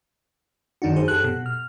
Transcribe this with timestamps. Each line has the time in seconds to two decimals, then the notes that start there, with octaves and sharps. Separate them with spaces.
0.82 F#2 D#3 D4 D#4 F#4
0.96 G#4 C5
1.08 F#2 G4 A4 F#6
1.24 B2
1.46 F6